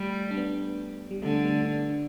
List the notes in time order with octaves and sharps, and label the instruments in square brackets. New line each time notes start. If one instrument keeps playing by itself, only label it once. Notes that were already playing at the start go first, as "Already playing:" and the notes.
Already playing: [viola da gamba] G3 [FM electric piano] A3
[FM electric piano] D4
B3
G3
[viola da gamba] D3 [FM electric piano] A3
[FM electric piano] A3
B3
D4